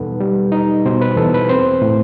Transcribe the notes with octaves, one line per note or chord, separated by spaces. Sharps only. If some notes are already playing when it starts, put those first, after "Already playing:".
Already playing: E2 B2 G3 D#4 A4 B4 F#5
G3
D#4
B2 C5
B4
E2 A4
B4
C4 C5
A2